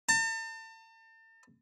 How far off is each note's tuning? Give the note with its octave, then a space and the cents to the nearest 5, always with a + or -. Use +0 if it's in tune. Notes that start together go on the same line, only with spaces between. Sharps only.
A5 +40